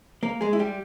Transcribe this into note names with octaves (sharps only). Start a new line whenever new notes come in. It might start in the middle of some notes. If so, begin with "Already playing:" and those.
A#3 A#4
G#3 G#4
E4
G3 G4